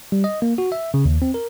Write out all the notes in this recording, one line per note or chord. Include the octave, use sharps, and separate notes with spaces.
G3
D#5
A#3
F#4
E5
C#3
D#2
C4
A#4